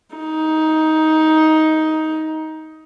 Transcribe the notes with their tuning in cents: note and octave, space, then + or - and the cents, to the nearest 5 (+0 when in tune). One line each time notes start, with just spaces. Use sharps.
D#4 +15